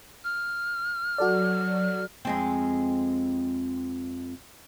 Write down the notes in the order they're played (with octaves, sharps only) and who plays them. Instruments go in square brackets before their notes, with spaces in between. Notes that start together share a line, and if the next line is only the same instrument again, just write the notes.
[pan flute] F6
[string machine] F#3 [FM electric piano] F#4 A4 D5
[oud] F2 G#3 C4